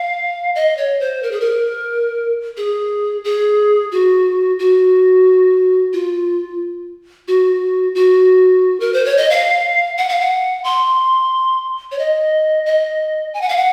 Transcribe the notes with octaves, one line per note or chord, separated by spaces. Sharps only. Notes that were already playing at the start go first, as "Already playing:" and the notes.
Already playing: F5
D#5
C#5
C5
A#4
G#4
A#4
G#4
G#4
F#4
F#4
F4
F#4
F#4
A#4
C5
C#5
D#5
F5
F#5
F5
F#5
C6
C#5
D#5
D#5
G#5
F#5
F5
F#5